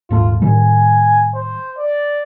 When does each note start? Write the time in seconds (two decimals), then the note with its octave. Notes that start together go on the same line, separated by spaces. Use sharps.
0.10 D#1 G#2 A3 F4
0.42 A2 D#3 G3 G#5
1.35 C5
1.78 D5